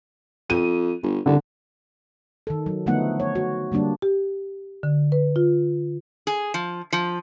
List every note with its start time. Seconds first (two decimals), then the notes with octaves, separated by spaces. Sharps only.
0.50 F2 D#7
1.03 G1
1.26 C2 D3
2.47 D#3 A4
2.66 F#3
2.86 D3 F3 A3 B3 D#4 F#5
3.20 C#5
3.35 F#4
3.72 D3 G3 A#3 D4
4.02 G4
4.83 D3
5.12 B4
5.36 F4
6.27 G#4
6.54 F3
6.93 F3